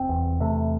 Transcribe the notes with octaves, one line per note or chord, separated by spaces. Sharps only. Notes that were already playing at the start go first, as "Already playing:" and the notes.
Already playing: F1 C4
E2
C3 A3